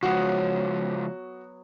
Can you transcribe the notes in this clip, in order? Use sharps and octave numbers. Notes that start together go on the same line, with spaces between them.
C#3 F3 F#3 G#3 B3 F#4